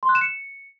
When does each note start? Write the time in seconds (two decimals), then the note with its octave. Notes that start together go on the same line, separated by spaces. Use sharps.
0.03 C6
0.09 F#6
0.15 E7
0.21 C#7